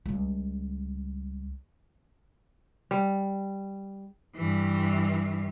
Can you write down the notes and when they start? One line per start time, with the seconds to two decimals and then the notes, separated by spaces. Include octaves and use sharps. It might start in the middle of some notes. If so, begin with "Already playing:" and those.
0.06 C#2 G3
2.91 G3
4.36 G2 E3